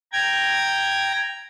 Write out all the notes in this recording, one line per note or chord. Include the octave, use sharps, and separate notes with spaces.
G5 A#5 G#6